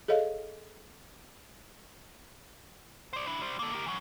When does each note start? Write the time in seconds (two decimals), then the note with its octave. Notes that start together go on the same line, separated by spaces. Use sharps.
0.08 G#4 A4 C#5 D#5 F5
3.13 C5 D5
3.27 D4 E4
3.41 G3 C5
3.59 A#3 A4
3.73 G4 A#4
3.86 E3 F#3